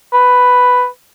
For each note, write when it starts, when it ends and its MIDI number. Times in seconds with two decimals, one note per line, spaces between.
0.13 0.86 71